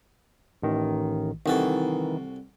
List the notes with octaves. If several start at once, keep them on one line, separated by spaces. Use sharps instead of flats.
A1 D#3
C2 D#3 E3 F#4 A4